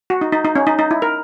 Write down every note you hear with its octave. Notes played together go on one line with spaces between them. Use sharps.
F#4
D#4
D#4
D#4
C#4
D#4
D#4
E4
A#4